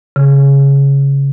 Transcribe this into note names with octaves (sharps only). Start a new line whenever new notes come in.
C#3